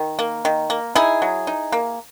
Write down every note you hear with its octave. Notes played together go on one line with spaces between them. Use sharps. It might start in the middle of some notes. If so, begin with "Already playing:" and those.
Already playing: D#3
A#3
D#3
A#3
D#4 E4 G#4
F#3
D#4
A#3